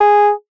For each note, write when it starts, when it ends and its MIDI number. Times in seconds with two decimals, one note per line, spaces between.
0.01 0.31 68